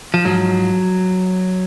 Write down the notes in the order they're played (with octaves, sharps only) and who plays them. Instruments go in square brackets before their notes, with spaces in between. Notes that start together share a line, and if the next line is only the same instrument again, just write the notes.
[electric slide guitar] F3
G#2 F3 F#3